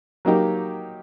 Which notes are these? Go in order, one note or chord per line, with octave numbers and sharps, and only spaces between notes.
F#3 A#3 D#4 G4